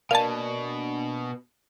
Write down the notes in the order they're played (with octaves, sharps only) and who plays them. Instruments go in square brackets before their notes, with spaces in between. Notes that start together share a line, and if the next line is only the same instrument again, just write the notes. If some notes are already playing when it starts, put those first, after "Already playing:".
[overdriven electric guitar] B2 [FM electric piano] A#3 D4 G#5 [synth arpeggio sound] F5 A5